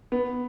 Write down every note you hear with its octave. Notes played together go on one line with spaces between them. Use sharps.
B3